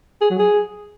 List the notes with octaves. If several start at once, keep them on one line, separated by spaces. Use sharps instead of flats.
G#4
F#3
G#4